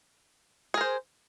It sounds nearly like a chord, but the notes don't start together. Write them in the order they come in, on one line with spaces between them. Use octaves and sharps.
G#4 A#4 C5